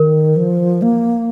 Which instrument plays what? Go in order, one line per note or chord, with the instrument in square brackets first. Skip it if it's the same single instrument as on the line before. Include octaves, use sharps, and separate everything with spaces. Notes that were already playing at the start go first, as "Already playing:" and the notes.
Already playing: [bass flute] D#3 [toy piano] A#4
[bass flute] F3
A#3